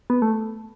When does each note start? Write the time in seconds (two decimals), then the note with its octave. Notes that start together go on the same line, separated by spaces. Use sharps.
0.10 B3
0.22 A3